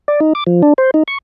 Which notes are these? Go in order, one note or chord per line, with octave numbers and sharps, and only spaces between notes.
D5
D#4
D6
F3
D4
C5
D#4
C#6